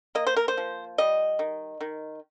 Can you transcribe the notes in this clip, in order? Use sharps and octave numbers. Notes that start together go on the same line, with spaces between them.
A#3 D#5
C5
A#4
C5
F3
G3 D#5
D#3
D#3